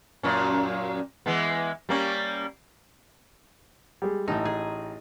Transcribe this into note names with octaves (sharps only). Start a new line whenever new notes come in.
F#2 A#2 C#4
E3 G#3 B3
G3 A#3 C#4
G3 G#3
A1 A2 A3 D#4
G#4